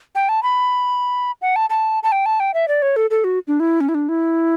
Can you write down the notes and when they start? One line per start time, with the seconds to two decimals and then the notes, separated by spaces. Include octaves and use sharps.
0.15 G5
0.29 A5
0.43 B5
1.42 F#5
1.56 A5
1.70 A5
2.03 A5
2.12 G5
2.26 A5
2.40 G5
2.54 E5
2.68 D5
2.82 C#5
2.96 A4
3.10 A4
3.24 F#4
3.48 D4
3.60 E4
3.81 C#4
3.89 E4
3.95 D4
4.09 E4